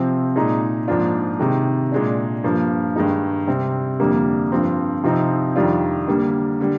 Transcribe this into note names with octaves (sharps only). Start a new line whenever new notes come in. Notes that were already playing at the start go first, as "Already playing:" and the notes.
Already playing: C3 F3 C4
A#2 G#3 D#4
G#2 F3 A#3 D4 F4
C3 D#3 G#3
A#2 G#3 D4
G2 F3 A#3
G2 D#3 G#3 D#4
C3 G3 C4
F2 D3 G3 A#3
G2 F3 C4
C3 F3 C4 D#4
F2 D#3 G3 D4 F4
D3 G3 A#3
D3 G3